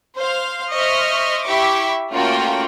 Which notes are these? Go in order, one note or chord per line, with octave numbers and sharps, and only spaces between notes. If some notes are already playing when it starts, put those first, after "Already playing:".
C5 F5
C5 D#5 E5 C#6 F6
E4 G4 E5 C#6 D6
A3 A#3 C#4 F4 F#4 G5